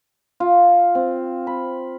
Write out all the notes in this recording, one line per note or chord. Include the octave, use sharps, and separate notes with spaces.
F4
C4
B5